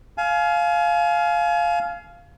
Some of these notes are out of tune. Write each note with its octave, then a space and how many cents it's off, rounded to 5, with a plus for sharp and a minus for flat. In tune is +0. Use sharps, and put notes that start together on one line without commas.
F5 +0 G#5 +35